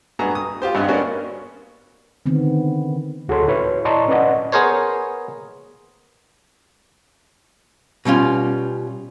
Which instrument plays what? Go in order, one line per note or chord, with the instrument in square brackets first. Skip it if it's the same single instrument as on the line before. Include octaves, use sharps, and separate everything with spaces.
[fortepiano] G2 B3 F#4 G#4 A#5
D#6
F4 G4 C5
G#1 G2 B3 B4
A#3 B3 C#4 D4 F#4 A#4
[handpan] D3 D#3 B3 C4
[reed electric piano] D2 F#4 G#4 A4 C#5 C6
E4 B4 C#5
D5 D#5 A5 A#5 C6 C#6
C#4 B4 D5 D#5 F#5
[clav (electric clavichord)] B3 G#4 A#4 C5 C#5
[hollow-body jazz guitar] B2 G3 C#4 F4